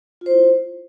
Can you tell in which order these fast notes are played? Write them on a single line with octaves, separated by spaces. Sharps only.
F4 C5 E4